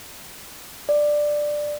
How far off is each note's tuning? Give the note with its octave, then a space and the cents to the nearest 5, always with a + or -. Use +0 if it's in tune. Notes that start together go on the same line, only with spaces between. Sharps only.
D5 +10